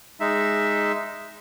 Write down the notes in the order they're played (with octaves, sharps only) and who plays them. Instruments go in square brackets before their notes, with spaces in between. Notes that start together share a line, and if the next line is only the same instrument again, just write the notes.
[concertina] G#3 D#4 E5